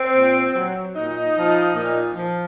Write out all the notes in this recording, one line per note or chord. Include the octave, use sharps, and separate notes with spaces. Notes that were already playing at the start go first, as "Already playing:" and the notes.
Already playing: C4
A#2
F#3
A#2 D#4
F3
A#2
F3